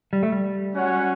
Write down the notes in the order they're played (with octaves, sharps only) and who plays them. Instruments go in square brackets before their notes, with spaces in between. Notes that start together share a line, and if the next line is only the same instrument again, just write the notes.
[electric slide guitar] G3
A3
G3
[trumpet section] C#4 F#4 C#5 F#5